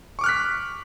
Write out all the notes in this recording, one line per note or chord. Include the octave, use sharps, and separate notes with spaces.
C#6 D6 F6 F#6 B6